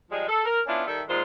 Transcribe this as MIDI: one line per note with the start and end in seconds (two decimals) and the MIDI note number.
0.10 0.27 53
0.10 0.27 55
0.10 0.27 56
0.29 0.43 69
0.45 0.61 70
0.67 0.84 59
0.67 0.84 61
0.67 0.84 62
0.67 0.84 64
0.67 0.84 65
0.86 1.01 51
0.86 1.01 55
0.86 1.01 69
0.86 1.01 76
1.08 1.22 39
1.08 1.22 46
1.08 1.22 56
1.08 1.22 65
1.08 1.22 72